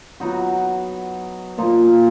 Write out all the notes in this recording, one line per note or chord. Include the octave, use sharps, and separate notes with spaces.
F#3 B3 D#4 F#4
A#2 F3 A#3 D#4